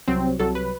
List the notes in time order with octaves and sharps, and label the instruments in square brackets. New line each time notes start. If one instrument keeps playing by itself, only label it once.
[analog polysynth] C2 C3 F#3 C4
C2 C3 F#3 A4
B4